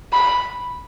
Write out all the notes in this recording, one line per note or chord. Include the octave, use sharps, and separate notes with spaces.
B5